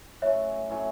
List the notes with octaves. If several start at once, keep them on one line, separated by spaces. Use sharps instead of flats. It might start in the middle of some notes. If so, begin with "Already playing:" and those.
A2 F#3 C#4 C#5 E5
A2 F#3 C#4